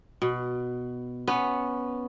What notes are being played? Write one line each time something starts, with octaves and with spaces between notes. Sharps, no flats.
B2
B3 C#4